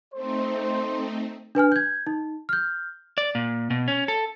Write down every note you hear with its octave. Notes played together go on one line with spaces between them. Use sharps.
A3 C4 D#4 C5
D4 B4 G#5 F6
G6 G#6
D#4
F6 G6
D5
A#2
B2
C#4
A4